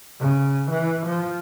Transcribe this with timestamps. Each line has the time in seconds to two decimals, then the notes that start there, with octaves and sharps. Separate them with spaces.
0.20 C#3
0.71 E3
1.06 F3